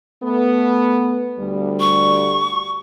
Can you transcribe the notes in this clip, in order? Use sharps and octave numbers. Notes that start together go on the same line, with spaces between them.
A3 B3
D2 G3
C#6